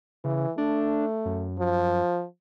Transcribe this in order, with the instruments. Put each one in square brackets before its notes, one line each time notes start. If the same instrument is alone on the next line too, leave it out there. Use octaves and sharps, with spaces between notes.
[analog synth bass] C#3 [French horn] E3
[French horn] A3 [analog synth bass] D4
[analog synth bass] F#2
[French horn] F3